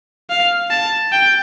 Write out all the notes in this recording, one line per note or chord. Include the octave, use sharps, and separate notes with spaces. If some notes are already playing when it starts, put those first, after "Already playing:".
F5
A5
G5